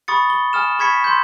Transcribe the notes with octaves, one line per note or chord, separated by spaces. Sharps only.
B5 C#6 D#6 A6 C#7
G7
G#5 D#6 F6 E7
B5 C#6 G#6 B6 C#7
C6 G6